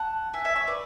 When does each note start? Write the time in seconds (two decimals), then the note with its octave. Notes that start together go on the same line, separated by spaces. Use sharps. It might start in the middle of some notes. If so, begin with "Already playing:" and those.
Already playing: F#5 A5
0.33 E5 G#5
0.44 E5 G#5
0.56 C#5 E5
0.67 B4 D5